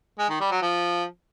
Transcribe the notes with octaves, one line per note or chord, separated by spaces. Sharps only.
G#3
D#3
G3
F#3
F3